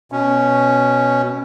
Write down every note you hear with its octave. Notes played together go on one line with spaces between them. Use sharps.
B2 C#4